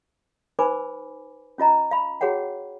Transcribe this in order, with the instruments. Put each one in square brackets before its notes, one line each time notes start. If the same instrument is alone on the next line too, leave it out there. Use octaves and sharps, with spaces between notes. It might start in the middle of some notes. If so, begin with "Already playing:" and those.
[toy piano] D#4 B4 C5 G#5 B5 D6
C#4 F4 D#5 A#5
F5 B5
F#4 G#4 C#5 F#5 G5